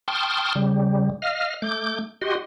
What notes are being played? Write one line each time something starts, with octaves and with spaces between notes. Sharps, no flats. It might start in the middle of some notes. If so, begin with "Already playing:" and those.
G5 A5 C6 C#6 D#6 F6
C#3 G3
D#5 F5 F6
A3 D6 G6
F#4 G4 D#5 C6